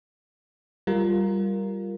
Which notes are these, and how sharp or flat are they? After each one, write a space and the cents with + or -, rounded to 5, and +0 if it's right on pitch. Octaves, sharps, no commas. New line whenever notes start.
G3 +0 F4 +0 A#4 +0